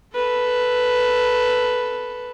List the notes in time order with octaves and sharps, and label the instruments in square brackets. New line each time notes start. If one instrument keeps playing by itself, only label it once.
[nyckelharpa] A4 B4